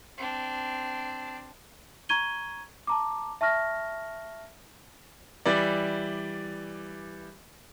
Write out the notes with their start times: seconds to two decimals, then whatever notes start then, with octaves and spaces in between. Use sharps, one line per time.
0.17 C4 D4
2.09 A#5 C#6 G#6 D#7 G7
2.87 A5 A#5 D6
3.41 E5 A5 C#6 F6 A#6
5.46 E3 G3 D5